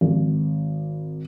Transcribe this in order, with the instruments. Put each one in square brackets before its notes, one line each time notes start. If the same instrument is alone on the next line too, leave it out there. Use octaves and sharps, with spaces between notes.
[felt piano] G#1